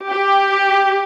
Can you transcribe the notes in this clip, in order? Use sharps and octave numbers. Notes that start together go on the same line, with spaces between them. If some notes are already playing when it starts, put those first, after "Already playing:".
G4